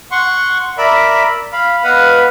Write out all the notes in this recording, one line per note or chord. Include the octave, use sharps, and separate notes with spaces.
F#5 C6 C#6
A#4 D5 E5 B5
F5 B5
B3 B4 D#5 F5 F#5 B5